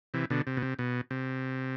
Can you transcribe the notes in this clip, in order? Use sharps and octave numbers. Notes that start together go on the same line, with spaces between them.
C3 E3
B2 D3
C3
B2
C3
B2
C3